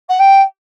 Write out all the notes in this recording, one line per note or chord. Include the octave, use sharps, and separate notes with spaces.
F#5
G5